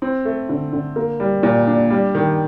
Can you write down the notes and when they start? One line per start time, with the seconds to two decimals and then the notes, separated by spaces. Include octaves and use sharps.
0.02 C4
0.25 A3
0.49 D3
0.73 D3
0.96 A#3
1.20 G3
1.43 A#2
1.67 D4
1.90 G3
2.15 D#3